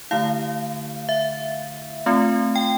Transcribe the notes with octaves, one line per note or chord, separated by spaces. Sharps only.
D3 A3 E4 F5
E5
A3 C4 F4
G5